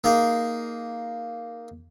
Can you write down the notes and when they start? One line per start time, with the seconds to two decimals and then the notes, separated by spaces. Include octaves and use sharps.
0.04 A#3 D#4 G#4